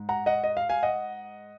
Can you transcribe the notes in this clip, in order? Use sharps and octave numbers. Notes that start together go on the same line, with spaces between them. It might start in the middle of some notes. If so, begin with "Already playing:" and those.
Already playing: G#2
F#5 A#5
D#5 F#5
D#5
F5
F5 G#5
D#5 F#5